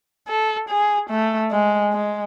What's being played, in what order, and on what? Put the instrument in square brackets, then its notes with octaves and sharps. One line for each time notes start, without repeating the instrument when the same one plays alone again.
[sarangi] A4
G#4
A3
G#3
G#3